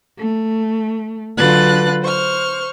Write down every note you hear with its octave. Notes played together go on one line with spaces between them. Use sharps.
A3
D3 F#3 F4 B4 F#6 A6
C5 C#6 F6